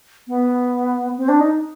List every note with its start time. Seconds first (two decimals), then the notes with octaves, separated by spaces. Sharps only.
0.28 B3
1.17 C4
1.29 D4
1.40 D#4